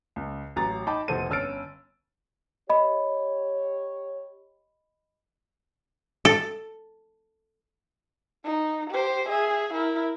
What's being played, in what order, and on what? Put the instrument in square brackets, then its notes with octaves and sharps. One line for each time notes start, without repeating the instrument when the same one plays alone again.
[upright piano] C#2
A1 F#3 A#5 A6
D#4 D#5 G5 A5 B5 D6
F1 A#1 F#4 A4 C5 D#7
G1 C#4 E6 F6 A6 D7
[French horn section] G4 C#5 [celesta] D#5 B5
[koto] A4
[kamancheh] D#4
G4 C5
G#4 E5
E4 A#4